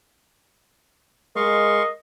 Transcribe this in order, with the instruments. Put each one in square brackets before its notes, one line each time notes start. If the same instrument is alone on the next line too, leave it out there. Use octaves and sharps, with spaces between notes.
[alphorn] G#3 [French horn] A#4 [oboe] D#5 [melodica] F5 C6 C#6